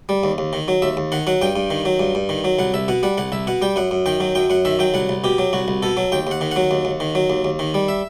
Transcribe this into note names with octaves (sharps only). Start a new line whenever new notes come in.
G3
D#2
D#2
D#3
F#3
D#2 E5
D#2
D#3 F#5
F#3 F#5
G2 G5
G2
D#3
F#3
G2
G2
D#3
F#3
C2 F#5
C2 E5
B2 F#5
G3 F#5
C2 F#5
C2 E5
B2 F#5
G3 G5
F#2 F#5
F#2
D#3 G5
F#3
F#2 G5
F#2 F#5
D#3 E5
F#3 G5
C2 F#5
C2
B2 G4
F#3
C2 F#4
C2
B2 A4
F#3
D#2 G5
D#2 F#5
D#3
F#3 F#5
D#2
D#2
D#3
F#3
D#2
D#2
D#3
G3
E5